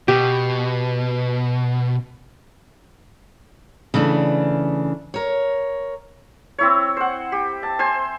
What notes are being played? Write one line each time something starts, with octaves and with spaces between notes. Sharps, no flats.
B2 G4
C#3 E3 A3 D4
A#4 C#5
C4 E4 C#5
C5 F#5
G4
A5
C5 G#5 C6